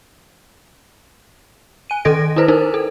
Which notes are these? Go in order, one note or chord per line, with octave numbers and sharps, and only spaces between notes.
G#5 D#7
D#3 C#4 A4 D#5 A#6 D7
E4 A4 B4 C5
D#4 E4 A#4 C5
A4